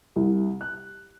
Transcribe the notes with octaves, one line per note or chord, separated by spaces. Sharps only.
C2
F#6